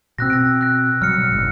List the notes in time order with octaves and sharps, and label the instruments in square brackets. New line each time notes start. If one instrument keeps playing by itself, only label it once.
[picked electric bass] B2 C4 [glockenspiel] E6 F#6 A#6
[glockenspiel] A#6 D7
F#6 A#6
[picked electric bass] B2 F#3 G3 [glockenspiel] F6 C#7
[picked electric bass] F#1 D2 G#2